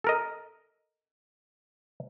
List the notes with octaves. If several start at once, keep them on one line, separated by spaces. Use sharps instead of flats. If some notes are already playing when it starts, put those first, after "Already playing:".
A4 A#4 D#5